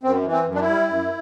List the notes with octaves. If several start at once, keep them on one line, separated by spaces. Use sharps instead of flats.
F#2 C4
E3
C4
F#2
D4
E4
G3
F#2